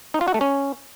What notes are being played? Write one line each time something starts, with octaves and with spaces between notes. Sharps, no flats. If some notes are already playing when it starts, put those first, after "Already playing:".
D#4
F4
F#4
A3
C#4